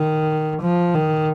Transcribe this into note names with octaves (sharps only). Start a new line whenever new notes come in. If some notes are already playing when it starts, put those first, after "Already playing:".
Already playing: D#3
F3
D#3